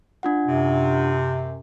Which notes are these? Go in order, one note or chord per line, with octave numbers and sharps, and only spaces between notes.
D4 F4 F#5
F#2 C3